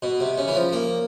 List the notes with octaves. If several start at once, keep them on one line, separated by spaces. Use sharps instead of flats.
B2
C3
C#3
E3
F3
A#3